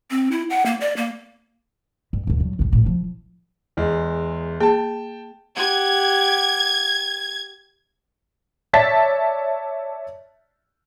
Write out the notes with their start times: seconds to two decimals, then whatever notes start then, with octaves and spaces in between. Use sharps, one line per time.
0.11 C4
0.31 E4
0.50 F#5
0.66 A#3
0.81 D5
0.97 A#3
2.13 G2
2.27 D#2 G#2
2.40 G2 F#3
2.59 G#1 D#2
2.73 A#1 A2
2.86 F3 E4
3.77 E2 G#3
4.61 A#3 G#4 G5 A5
5.56 G4 F#5 G#6
8.73 C#5 D5 E5 A5 A6 B6